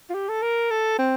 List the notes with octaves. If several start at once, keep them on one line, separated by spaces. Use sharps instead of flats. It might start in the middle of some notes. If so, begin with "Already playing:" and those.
F4
G4
A4
A#4
A4
C4